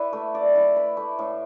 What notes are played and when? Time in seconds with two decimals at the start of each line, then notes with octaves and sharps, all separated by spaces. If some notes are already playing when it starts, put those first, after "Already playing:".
Already playing: E4 B4 D5
0.13 A3
0.35 D5
0.55 E4
0.76 B4
0.97 A3
1.19 A2